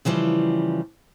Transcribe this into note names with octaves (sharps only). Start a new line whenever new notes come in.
C#3 E3 F3 G3